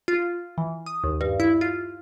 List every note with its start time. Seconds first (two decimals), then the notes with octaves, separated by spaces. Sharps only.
0.08 F4
0.58 E3
0.86 D#6
1.04 D#2
1.21 G2
1.40 E4
1.61 F4